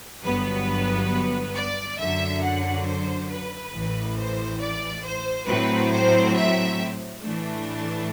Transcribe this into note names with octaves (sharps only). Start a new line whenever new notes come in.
G1 G2 F#3 B3 B4
D5
F#2 D3 F#3 E5
F#5
C5
B4
A1 A2 E3
C5
D5
C5
A2 F#3 C4 B4
C5
E5
A2 E3 A3 D4
A5